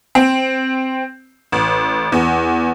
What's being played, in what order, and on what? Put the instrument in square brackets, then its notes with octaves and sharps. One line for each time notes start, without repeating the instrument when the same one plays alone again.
[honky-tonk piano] C4
A1
E2